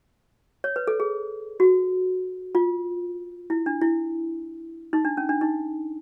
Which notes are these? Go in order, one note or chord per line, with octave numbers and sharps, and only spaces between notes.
C#5
B4
A4
G#4
F#4
F4
E4
D4
E4
D#4
D4
C#4
D4
D#4